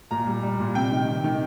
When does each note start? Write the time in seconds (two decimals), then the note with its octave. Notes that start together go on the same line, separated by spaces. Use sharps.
0.11 A#2 A#5
0.27 G3
0.43 G3
0.60 A#2
0.75 C3 G5
0.92 D#3
1.08 C3
1.24 D#3